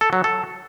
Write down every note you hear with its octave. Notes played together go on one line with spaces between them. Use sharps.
A4
F#3
A4